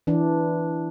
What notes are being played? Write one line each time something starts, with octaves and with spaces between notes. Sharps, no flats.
E3 D4